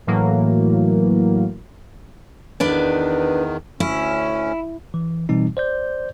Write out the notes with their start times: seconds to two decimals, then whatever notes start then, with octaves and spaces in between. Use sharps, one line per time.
0.07 A2 E3 F#3 A#3
2.60 E2 D#3 D4 B4 D5
3.80 D2 C#4 E4
4.94 E3
5.29 B2 E3 G3 C4 D#4
5.57 C5 D5 G6